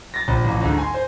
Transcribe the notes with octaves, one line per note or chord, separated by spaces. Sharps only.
A6 A#6
A#1
A1 F2
D2 G#2 D3
G#5 C6
C5